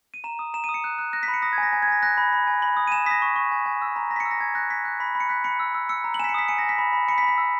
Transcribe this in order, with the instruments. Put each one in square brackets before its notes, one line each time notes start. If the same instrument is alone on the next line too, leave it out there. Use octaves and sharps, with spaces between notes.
[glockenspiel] D#7
A#5 E7
D#6
A#5 E7
D#7
D#6
C#7
F#6
F#6
F#6 A#6
B6
B5
C#7
D#6 A#6
G#6
G#5
A#6
G#5
G#6
G#5 A#6
F#6 A#6
B5
B5
G#5
B5 F#7
D#6
D#7
G#5 E7
D#6 A#6 B6
C#6
C#6
G#5
G#5
E6
A#5
A#5 A#6
B6
C#7
E6
A#6
G#5 G#6
F#6 A#6
G#5 B6
F#6
B5 B6
B5
C#7
F#6 B6
B5 C#7
E6
E6
E6 C#7
A#5
F#7
G#5 B6 E7
C#7
D#6 B6
G#5 C#7
A#6
G#5
B6
B5
B5
B5 C#7
B6
B5
B6
E6